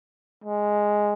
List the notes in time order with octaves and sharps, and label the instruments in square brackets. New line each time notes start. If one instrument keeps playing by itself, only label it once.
[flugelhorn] G#3